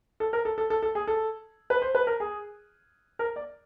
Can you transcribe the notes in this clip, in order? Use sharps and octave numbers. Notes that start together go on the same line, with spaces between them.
A4
A#4
A4
A4
A4
A4
G#4
A4
B4
C5
B4
A#4
G#4
A#4
D5